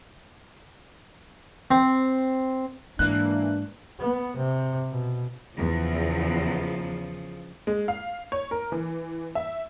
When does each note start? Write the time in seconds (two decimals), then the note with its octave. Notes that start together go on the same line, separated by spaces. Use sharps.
1.71 C4
2.99 G#2 E3 G#3 A#3 D4 F#6
3.99 B3
4.37 C3
4.91 B2
5.57 E2 C#3 F3
7.67 G#3
7.88 F5
8.32 C#5
8.51 A#4
8.72 E3
9.35 E5